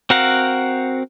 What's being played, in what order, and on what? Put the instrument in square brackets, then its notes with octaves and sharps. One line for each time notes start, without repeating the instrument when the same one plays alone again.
[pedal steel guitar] C4 F#4 A#4 F5 F#5